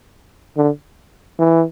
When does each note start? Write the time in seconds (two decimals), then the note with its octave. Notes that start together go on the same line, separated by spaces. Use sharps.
0.57 D3
1.39 E3